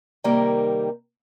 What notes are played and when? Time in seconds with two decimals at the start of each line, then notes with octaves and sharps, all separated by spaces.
0.24 C3 D#3 G3 A#3 D#4 A#4